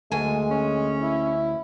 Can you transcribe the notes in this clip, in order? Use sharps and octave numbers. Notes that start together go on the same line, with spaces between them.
D2 G#3 G#5
C#4
E4